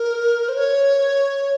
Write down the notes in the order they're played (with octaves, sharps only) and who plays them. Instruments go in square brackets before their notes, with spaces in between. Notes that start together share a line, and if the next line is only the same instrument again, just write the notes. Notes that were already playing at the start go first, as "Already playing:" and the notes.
Already playing: [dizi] A#4
C5
C#5